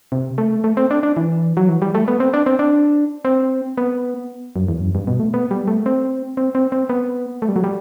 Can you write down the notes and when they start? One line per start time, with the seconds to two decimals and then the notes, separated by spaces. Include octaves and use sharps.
0.12 C3
0.38 A3
0.64 A3
0.77 C4
0.91 D4
1.03 D4
1.17 E3
1.57 F#3
1.69 E3
1.82 G3
1.95 A3
2.08 B3
2.20 C4
2.33 D4
2.46 C4
2.59 D4
3.25 C4
3.78 B3
4.56 F#2
4.68 E2
4.81 F#2
4.95 G2
5.07 B2
5.20 A3
5.34 B3
5.51 G3
5.68 A3
5.86 C4
6.37 C4
6.55 C4
6.72 C4
6.89 B3
7.42 A3
7.49 G3
7.56 F#3
7.64 G3